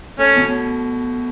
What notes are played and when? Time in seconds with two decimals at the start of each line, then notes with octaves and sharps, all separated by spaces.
0.18 A3 C#4
0.36 B2